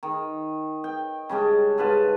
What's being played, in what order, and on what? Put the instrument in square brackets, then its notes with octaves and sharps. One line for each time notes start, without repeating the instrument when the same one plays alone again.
[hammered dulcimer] D#3
G5
C#3 G3 G#3 D4
G#2 F4 B4 A5